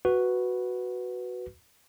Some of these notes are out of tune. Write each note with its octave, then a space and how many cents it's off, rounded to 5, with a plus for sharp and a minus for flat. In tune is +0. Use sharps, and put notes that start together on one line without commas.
F#4 +0 B4 +0